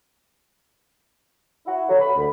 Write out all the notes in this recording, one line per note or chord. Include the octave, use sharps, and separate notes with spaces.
E4 F#4
D3 F#3
B5
D2